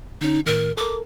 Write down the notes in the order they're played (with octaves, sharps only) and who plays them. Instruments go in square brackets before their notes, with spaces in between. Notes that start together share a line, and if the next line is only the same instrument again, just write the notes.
[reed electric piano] D3 C#4 [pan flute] D#4
[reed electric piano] A2 D#3 [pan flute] A#4
[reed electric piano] A4 A#4 [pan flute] D6